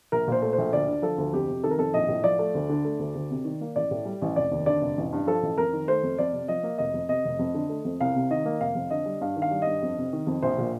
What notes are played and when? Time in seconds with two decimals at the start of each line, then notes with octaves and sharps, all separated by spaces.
0.12 A#1 A#4
0.28 A#2 C5
0.42 A3
0.53 C5
0.58 A#1
0.73 D2 D5
0.88 D3
1.02 F3 A4
1.18 D2
1.33 F2 G4
1.48 C3
1.64 D#3 A4
1.71 A#4
1.78 F2 A4
1.94 A#1 D#5
2.09 A2
2.24 F3 D5
2.39 A3
2.55 D2
2.69 D3
2.85 A3
2.99 D2
3.15 D2
3.30 C3
3.45 D#3
3.61 A#3
3.76 A1 D5
3.91 A2
4.05 G3
4.22 A1
4.36 F1 D5
4.51 D#2
4.66 D3 D5
4.82 F1
4.97 A1
5.13 G2
5.27 F3 A4
5.43 A1
5.57 F2 A#4
5.73 D#3
5.88 A3 C5
6.03 F2
6.18 F2 D5
6.33 C3
6.48 F3 D#5
6.63 A#3
6.78 F1 D#5
6.94 F2
7.09 C3 D#5
7.25 F1
7.39 F2
7.54 D3
7.69 A3
7.85 F2
8.00 C2 F5
8.15 C3
8.31 D#3 D#5
8.45 A#3
8.60 F1 F5
8.75 F2
8.90 D3 D#5
9.06 G3
9.21 G2 F5
9.36 D#3
9.42 F5
9.51 G3
9.62 G2 D#5
9.82 F2
9.97 C3
10.13 D#3
10.27 F2
10.42 A#1 C5
10.58 A#2